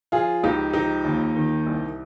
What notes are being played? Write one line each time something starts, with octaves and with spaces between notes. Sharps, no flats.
F3 F4 G#4
C#2 D#4 G4
F3 D#4 G4
D#2
D#3
C2